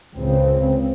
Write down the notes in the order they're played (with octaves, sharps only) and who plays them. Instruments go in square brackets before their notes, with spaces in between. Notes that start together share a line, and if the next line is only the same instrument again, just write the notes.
[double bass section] C#2 C#3 C4